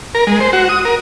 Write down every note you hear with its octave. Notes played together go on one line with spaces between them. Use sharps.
A#4
G#3
C5
F#4
D#6
A#4